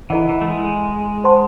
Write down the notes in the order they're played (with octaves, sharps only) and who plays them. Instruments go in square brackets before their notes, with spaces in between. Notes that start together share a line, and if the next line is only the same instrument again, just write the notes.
[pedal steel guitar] E3 [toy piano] E4 A4 D#5 F#5
[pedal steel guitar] E3
A3
G#3
[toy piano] C5 F#5 A5 C6